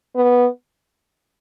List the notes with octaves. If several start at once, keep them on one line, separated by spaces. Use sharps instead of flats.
B3